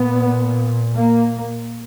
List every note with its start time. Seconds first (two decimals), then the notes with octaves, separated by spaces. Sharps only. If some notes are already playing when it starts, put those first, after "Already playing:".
Already playing: A#2 B3
0.95 A#3